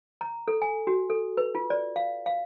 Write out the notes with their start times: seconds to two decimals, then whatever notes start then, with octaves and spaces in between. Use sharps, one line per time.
0.21 A#5
0.48 A4
0.62 G#5
0.87 F#4
1.10 A4
1.37 B4
1.55 F4
1.70 D5
1.96 F5
2.26 F5